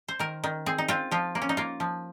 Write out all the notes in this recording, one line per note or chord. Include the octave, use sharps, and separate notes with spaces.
C5
D#3 A#4
D#3
C4 G#4
D#4
C4 F4
F3 F4
A#3
C#4
D#4
A#3 F4
F3